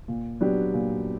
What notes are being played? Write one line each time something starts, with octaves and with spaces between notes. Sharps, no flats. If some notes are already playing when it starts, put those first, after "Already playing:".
A#2
F#3 B3 D4 G4
A#2